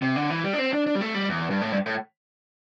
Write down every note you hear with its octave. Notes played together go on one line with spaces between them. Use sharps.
C3
D3
E3
G3
D4
C4
D4
D4
G3
A3
G3
E2
G2
A2
G2
A2